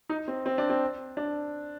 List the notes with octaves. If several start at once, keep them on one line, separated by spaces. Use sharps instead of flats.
D#4
C4
C4
D4
C4
D4